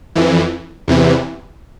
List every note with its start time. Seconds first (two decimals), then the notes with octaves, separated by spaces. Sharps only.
0.15 F2 E3
0.88 E2 C3 E3